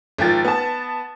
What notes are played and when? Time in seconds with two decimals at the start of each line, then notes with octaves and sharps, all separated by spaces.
0.19 G#1 F3 G5 A6
0.45 B3 A5